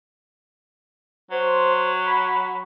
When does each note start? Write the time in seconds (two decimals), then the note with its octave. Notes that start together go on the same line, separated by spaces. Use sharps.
1.31 F#3 C5
2.03 B5